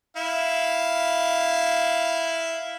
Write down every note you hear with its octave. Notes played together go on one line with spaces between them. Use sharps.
E4 F5